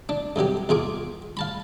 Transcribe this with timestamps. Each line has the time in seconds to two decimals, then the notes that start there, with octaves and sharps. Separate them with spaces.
0.09 D4
0.36 G2 C3 F#3 G4
0.69 E2 F4 G#4 D6
1.37 F5 A5 B5